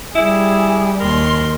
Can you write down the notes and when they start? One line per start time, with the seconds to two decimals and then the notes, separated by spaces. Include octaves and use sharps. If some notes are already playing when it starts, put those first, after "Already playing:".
0.15 G3 E4 G#4
1.00 D#2 A#4 C6